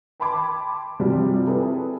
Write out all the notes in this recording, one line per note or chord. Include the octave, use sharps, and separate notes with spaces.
G5 A5 B5 C6 D6 G#6
C3 F3 G3 C4 F#4 G#4
C4 E4 G#4 A4 B4